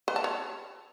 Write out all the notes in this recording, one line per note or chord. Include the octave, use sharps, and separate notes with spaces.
B4
A5
C#5